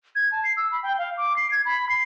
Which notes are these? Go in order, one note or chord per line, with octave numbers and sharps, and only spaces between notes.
G#6
A5
C7
E6
B5
G5
F5
D6
C7
G#6
B5
C7